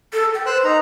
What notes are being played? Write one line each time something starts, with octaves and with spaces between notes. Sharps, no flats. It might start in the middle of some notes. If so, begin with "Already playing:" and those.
A4
G5
B4 C5 E6 F#6
D#4 A#5